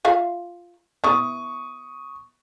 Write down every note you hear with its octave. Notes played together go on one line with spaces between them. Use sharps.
F4 E5 F5
B3 E4 C#6 D#6